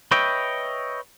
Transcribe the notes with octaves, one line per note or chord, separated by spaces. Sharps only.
B4 C#5 D#5 E5 G5